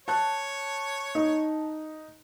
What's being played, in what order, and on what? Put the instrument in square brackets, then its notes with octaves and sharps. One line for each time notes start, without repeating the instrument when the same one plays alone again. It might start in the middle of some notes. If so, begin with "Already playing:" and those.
[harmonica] C#5 [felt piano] A5 F#6
[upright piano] D#4